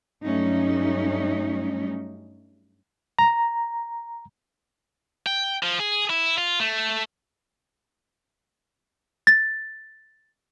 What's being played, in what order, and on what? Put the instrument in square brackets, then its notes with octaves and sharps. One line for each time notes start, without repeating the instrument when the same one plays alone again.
[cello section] G2 F#3 G3 A3 C#4 D#4
[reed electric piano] A#5
[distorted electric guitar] G5
F3
G#4
E4
F4
A3
[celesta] A6